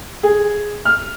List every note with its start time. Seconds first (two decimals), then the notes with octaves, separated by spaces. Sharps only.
0.23 G#4
0.85 F6